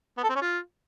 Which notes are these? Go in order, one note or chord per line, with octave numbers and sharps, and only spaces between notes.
B3
A4
C4
C#4
F4